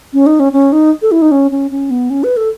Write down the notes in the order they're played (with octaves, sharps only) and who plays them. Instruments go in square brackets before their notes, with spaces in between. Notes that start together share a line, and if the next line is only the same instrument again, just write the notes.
[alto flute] C#4
D#4
C#4
C#4
D#4
A4
E4
D#4
C#4
C#4
C#4
B3
C#4
B4
A4